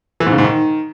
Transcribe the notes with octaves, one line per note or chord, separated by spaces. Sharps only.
E3
G#2
C#3
G#2
D#3